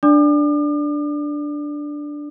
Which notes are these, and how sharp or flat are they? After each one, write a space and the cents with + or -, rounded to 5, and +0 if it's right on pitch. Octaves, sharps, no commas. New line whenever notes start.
D4 +0 D5 +0 D6 +40